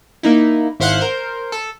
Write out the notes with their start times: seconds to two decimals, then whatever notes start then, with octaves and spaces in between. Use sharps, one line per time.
0.23 A#3 D#4 E4
0.80 G#1 E4 C5 F5 F#5 F#6
1.01 A#4 C5
1.52 A4